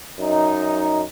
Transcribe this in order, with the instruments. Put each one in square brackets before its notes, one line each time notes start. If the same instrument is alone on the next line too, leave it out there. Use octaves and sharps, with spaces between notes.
[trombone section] F#2 D#4